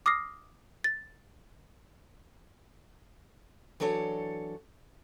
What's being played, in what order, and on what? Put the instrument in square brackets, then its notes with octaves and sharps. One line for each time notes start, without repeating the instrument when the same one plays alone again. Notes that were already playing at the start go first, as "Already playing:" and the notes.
[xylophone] D6 D#6 F6 A#6 C7
A6
[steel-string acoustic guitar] E3 F#3 D4 A4 C#5